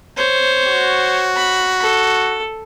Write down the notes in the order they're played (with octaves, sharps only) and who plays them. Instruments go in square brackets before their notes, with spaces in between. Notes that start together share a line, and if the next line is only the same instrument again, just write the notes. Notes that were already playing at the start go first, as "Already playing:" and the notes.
[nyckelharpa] C5 C#5
[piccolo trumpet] F#4
[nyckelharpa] B5
A4